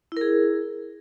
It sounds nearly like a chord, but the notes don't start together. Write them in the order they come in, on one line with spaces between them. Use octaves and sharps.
E4 A#4 G#4